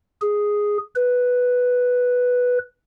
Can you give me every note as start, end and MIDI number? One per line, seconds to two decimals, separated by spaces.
0.22 0.78 68
0.95 2.58 71